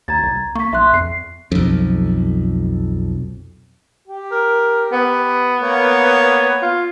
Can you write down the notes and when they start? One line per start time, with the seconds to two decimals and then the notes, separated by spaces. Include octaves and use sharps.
0.08 D#2 A#5 G#6 A6
0.23 C2
0.55 A#3 C#6 B6
0.73 B1 E5 C6 F#6
0.94 F2 C7
1.52 B1 F2
4.07 G4
4.31 A#4
4.92 B3
5.61 A#3 C#5
6.62 F4